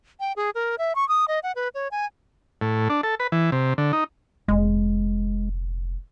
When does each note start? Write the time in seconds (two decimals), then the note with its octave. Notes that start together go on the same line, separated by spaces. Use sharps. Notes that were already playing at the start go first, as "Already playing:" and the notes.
0.20 G5
0.36 G#4
0.55 A#4
0.78 E5
0.96 C#6
1.09 D#6
1.28 D#5
1.43 F#5
1.56 B4
1.75 C#5
1.91 G#5
2.61 A2
2.90 D4
3.03 A4
3.20 B4
3.32 E3
3.52 C3
3.78 D3
3.93 D#4
4.48 F1 A#2 G#3